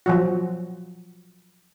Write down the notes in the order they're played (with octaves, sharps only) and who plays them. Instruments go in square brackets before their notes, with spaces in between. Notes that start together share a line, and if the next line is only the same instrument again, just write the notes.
[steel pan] F3 F#3 F#4